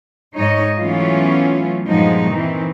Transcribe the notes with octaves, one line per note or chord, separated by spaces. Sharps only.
G#2 D#4 C#5 D#5
E3 F#3 A3 B3 C#4 F4
G2 A#2 F3 G#3 B3 D#4
D#3 E3 C4